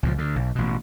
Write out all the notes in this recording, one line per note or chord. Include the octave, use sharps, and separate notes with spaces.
C#2 A#2 F3
D2 D3
B1
A1 B2